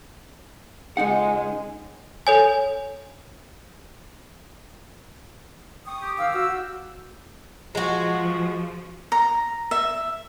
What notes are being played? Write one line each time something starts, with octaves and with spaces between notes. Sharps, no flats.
C#2 G#3 D#4 F#5
A4 C#5 G#5
G5 C#6 D#6
G4
G#2 D#3 F5 E6
F#4 E6
F3 G#3 F#4
A#5
E5